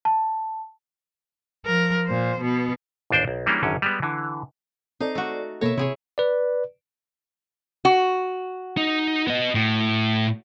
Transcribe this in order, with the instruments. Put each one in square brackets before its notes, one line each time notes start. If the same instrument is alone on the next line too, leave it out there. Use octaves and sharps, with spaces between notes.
[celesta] A5
[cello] F3 A#4
A#2 C5
B2 B3
[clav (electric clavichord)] A1 D#2 D4 C5 G5
B1
E3 G3 G#3 A#3 C#4 D4
G#1 F#2 D3 C#4
G3 G#3 B3
D3 E3
[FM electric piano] C4 A4 D5 [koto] D#4
[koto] A3 F#4
[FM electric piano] B2 A#3 A4 [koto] C#5 E5
[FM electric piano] C3 [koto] E4 G#4 C#5
[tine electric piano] B4 D5
[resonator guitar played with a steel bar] F#4
[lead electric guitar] D#4
B3 D#5
A2